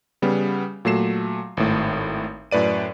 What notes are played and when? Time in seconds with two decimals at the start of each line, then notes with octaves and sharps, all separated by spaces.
0.22 C#3 G3 B3
0.85 A#2 F#3 A3 C7 E7
1.57 G#1 A2
2.51 F#2 A2 B4 D5 D#7